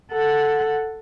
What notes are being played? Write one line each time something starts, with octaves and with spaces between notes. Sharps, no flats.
A4 F#5